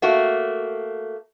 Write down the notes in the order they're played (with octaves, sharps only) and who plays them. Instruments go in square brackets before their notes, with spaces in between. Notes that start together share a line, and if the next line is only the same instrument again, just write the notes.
[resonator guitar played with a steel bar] A3 A#3 F#4